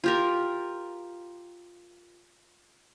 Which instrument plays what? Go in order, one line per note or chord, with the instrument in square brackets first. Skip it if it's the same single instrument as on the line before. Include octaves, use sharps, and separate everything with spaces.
[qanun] F4 G4 A#4